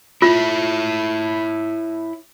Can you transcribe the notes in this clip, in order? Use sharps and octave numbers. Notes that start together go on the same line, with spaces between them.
E4 F4 C#5 E5